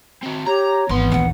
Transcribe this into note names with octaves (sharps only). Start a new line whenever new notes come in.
C4 F#4
G4 C#5 A#5
G#1 E3 B3 C6
A#1 D#2 F#5